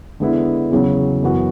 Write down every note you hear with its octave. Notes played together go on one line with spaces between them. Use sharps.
D3 G#3 B3 E4
E2 C#3 F#3 C#4
F#2 E3 B3 F#4